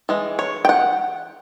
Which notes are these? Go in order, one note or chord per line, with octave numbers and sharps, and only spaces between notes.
E3 G#3
C#5
G5
F#5